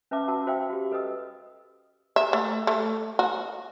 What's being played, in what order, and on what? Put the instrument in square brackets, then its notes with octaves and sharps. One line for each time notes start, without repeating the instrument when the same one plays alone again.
[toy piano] C#4 B4 E5 F5 A5 D6
F#4 F#5 A5 E6
F#4 C5 E5 F5 G5 E6
F#4 G4
A4 B4 D#5 D#6 E6
[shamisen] E5
A3
A3
F#4